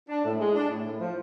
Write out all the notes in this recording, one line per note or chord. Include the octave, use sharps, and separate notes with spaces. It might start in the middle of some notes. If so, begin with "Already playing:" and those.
D4
A2
G#3
D4
A2
A2
F3